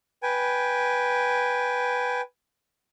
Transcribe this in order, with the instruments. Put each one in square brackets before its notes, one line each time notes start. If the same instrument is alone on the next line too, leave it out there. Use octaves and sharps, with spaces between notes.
[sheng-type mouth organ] B4 G5 G#5